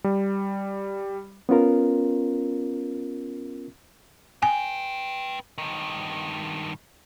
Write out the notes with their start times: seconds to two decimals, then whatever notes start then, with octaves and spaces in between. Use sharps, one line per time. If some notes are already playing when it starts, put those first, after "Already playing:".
0.04 G3
1.49 B3 C#4 F4 A#4
4.43 B4 G5 G#5
5.58 G2 D#3